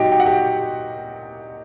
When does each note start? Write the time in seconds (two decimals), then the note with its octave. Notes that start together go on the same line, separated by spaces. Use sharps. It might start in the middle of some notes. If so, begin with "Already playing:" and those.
Already playing: A#2 F#3 D#4 F#4 G4 G5
0.12 G5
0.20 F#5
0.26 G4 G5